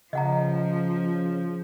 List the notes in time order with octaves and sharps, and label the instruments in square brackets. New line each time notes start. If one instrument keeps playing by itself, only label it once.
[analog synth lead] C#3 [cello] F3 [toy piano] D#5 F#5 A#5